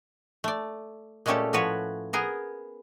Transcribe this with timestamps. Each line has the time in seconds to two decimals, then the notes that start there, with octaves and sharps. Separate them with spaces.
0.44 A3 D5
1.26 A#2 G#3 A3 C#4 G4 A4
1.53 A2 F3 F#4 B4 C#5
2.13 B3 G#4 A#4